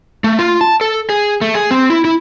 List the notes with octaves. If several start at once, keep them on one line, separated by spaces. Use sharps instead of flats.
A3
F4
A5
A4
G#4
A3
G#4
C4
E4
E4